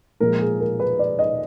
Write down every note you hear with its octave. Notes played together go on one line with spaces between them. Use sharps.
A#2 F3 G#3 A#4
G#4
A#4
B4
D5
D#5